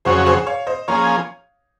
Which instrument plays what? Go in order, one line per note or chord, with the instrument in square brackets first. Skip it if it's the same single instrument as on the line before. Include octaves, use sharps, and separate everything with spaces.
[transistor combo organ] F2 C#3 F#3 C#4 F#4 [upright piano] G#4 C5
[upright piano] G#4 C5
C#5 F5
C5 D#5
[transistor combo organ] F3 A#3 C#4 G#4 [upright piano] C#5 F5